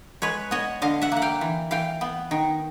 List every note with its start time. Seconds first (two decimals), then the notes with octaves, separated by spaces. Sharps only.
0.22 G#3 B4 C#5
0.51 B3 C#5 D#5
0.82 D3 D#5 F5
1.01 E5 F#5
1.12 A#3 F#5
1.22 F5 G5
1.41 E3
1.71 E3 F5 G5
2.01 B3
2.31 D#3